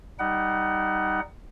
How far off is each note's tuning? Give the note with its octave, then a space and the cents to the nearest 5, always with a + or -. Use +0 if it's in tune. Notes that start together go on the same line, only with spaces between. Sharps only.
G3 +0 D#4 +0 F#5 +20